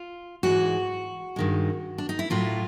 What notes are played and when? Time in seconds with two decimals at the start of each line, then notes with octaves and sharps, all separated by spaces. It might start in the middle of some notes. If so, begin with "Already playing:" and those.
Already playing: F4
0.43 G#2 E3 G#3 F#4
1.36 G2 D#3 G#3
1.98 D4
2.09 D#4
2.19 E4
2.30 A2 F#3 A3 F4